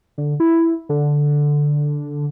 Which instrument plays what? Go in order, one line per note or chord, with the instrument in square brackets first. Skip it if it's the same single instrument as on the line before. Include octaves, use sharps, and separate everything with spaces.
[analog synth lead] D3
E4
D3